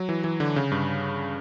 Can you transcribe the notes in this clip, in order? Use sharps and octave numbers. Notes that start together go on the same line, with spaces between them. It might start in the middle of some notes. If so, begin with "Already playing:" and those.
Already playing: F#3
E3
E3
D3
C#3
G2